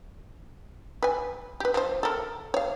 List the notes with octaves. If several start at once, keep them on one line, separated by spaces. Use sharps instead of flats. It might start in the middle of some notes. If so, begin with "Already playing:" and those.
B4 G#5
G4 B4
F3 C5
A4 A#4
C#5 F5